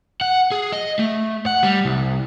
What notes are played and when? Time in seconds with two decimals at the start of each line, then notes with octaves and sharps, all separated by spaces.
0.21 F#5
0.52 G#4
0.72 D#5
0.99 A3
1.46 F#5
1.63 G3
1.85 C2